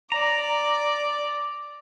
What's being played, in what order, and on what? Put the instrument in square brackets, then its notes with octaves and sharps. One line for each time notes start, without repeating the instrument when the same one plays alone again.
[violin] D5 [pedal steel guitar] A#5